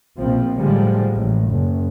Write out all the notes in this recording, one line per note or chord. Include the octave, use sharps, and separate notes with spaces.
A#1 B2 F3 C4
A2 D3 F3 G3 G#3
A1
F#1